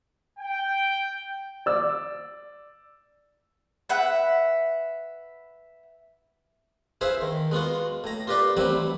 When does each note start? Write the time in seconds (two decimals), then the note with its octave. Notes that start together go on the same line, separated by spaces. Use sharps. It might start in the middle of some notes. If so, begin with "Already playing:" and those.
0.39 G5
1.66 D5 E6
3.89 B4 E5 F#5
7.01 E4 G#4 B4 C5 E5 F5
7.21 D#3
7.51 G#3 B3 F4 F#4
8.04 A2 A#5
8.27 F4 G4 A#4 B4 D5 F5
8.57 A1 F#3 G3 C4 E4 B4